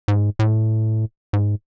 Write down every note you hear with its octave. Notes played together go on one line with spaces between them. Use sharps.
G#2
A2
G#2